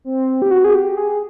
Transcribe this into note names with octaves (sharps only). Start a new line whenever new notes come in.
C4
G4
F#4
G#4
G4
G#4